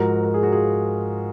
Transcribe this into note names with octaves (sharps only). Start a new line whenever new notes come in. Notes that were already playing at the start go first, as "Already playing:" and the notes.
Already playing: G#2 F3 F#4 A#4
A#4
G#4
F#4
F4 G#4